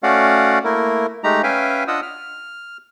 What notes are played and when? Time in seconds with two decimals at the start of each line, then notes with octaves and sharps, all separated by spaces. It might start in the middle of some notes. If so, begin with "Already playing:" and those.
0.03 A3 C#4 F#4 D5 F5 F#5
0.64 A3 A#3 E4 A#4
1.24 G#3 A3 D#4 G4 A#5
1.43 C#4 B4 E5 F5 G5 G#5
1.88 D4 F4 D#5 F#5 D#6 E6
2.02 F6